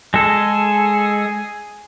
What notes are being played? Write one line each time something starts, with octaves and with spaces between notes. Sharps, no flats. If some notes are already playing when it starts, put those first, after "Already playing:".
G#3 G#4 A4